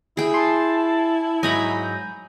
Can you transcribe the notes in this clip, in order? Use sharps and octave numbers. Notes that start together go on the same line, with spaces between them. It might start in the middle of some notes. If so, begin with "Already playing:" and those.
E4 G#4 G5
A5 C6
G#2 F#3 D#5 G#5 A#5 B5 G6